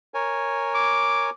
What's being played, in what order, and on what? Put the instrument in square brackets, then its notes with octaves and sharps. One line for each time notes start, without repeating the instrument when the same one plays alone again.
[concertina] A#4 C#5 G#5
[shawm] D6